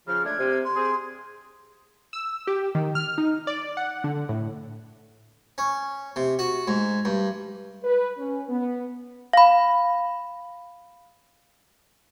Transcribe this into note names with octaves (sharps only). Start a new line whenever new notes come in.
C#3 F3 F6
G#3 A3 D4 G#6
C3
C6
C4 G#4
E6
G4
D#3
F6
D#4
D5
F#5
D3
A2
C#4
C3
F#4
G#2
G2
B4
C#4
B3
F5 B5